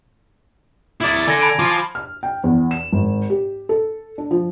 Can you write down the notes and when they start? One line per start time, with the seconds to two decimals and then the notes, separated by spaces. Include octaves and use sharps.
1.01 E4 D5
1.27 D3 G#5 G#6 A#6
1.41 A5 B5 D7
1.59 F3 F4 D6
1.95 F6
2.23 G5
2.44 E2
2.71 E7
2.93 G#1
3.30 G4
3.69 A4
4.18 D4
4.31 F3